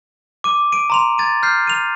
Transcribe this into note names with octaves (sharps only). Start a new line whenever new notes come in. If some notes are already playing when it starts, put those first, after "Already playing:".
D6 D#7
D7 D#7
A#5 C6 F7
G#6 A6 D#7
F6 G6 C7
D#7 F7